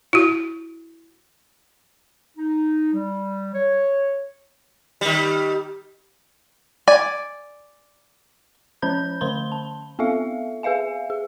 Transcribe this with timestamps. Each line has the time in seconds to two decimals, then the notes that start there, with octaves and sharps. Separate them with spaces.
0.13 E4 F#4
2.38 D#4
2.93 G3
3.54 C#5
5.01 D#3 G3
6.88 D5 G#5
8.82 F3 C#4 C5 B5 G6
9.21 D3 A3 C5 B5 C6 G7
9.52 A5
9.99 B3 C4 F4 A4 E5 F5
10.63 G#4 B4 E5 F5 G#5
11.10 G#4